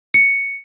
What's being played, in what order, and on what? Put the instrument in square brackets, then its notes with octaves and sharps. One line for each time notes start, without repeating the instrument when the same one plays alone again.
[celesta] C#7